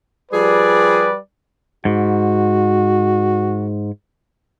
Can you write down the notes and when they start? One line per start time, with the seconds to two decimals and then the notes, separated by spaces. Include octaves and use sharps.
0.32 F3 G3 G4 G#4 B4 D5
1.85 G#2 F#4